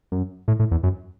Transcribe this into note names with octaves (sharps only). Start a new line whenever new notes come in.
F#2
A2
A2
E2
F#2